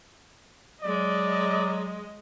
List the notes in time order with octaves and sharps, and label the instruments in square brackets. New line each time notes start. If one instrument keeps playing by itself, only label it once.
[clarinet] F#3 [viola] G#3 D#5 [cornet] D5